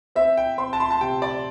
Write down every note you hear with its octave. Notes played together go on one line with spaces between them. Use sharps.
C4 E5
G5
C4 C6
A5
C6
A5
C3 G5
D5